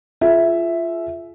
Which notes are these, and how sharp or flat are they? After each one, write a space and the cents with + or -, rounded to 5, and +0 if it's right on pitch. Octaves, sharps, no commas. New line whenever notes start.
F4 -20 G#4 +35 E5 +0